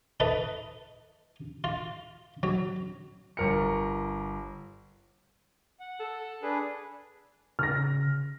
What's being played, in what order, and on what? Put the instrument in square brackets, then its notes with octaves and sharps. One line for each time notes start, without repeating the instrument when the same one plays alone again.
[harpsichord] D#4 A4 B4 E5
F4
F#3
[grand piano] G1 A#4 C#7
[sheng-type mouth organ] F#5
[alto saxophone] A4
[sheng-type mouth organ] D4 G#4 B4
[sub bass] C#3 [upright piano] F6 A#6